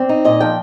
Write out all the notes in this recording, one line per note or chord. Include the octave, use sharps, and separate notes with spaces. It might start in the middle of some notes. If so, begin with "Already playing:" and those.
Already playing: C4 D5
D#4
A#2 D#5
F3 G5